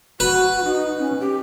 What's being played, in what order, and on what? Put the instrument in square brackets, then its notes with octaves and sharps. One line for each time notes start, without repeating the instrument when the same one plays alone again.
[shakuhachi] F#4 [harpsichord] B4
[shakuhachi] D#4
C#4
G4